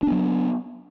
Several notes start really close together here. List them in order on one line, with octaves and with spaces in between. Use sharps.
D4 B3 F#3